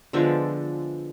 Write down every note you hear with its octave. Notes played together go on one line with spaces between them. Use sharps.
D3 F3 G#3 B3 D5 E5